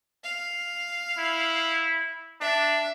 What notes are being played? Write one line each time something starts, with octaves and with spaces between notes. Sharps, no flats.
F5
E4
D4 E5